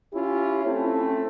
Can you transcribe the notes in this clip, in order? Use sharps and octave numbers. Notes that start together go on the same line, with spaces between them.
C#4 E4 F4 G4
A3 C4 C#4 E4